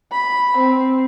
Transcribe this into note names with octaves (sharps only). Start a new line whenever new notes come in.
B5
C4